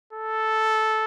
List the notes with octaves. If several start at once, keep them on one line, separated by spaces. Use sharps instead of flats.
A4